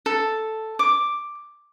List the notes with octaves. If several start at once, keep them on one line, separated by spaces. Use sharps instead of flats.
A4
D6